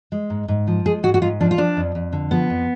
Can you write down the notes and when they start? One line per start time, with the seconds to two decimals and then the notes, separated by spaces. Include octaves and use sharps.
0.12 G#3
0.30 G#2
0.48 G#2
0.67 F3
0.86 G#3 G#4
1.03 G#2 F#4
1.14 F#4
1.22 G#2 F4
1.41 F3 D4
1.51 F4
1.58 F3 D4
1.77 F2
1.95 F2
2.13 D3
2.31 F3 B3
2.50 F2